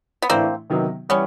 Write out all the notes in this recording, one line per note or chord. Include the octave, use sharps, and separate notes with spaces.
B3
A2 E3 A3 A#3 C4 D4
C3 D#3 F#3 B3 D#4
E3 G3 B3 C#4